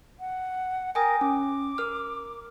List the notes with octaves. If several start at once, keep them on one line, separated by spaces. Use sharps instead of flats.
F#5
A#4 G5 G#5 D#6
C#4 D6
A#4 F6